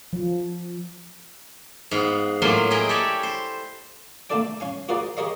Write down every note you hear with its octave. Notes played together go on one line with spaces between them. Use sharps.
F3
G#2 B3 F5
A2 F#3 A#3 F4 G#5 C6
E4 G#4 A#4 D#5 G5
G4 A4 C#5 D5 E5
C5
A3 A#3 D4 A4 D5 G5
C#4 F5 G#5
F4 F#4 G#4 A#4 C5 D5
G4 G#4 A#4 C#5 D#5 F5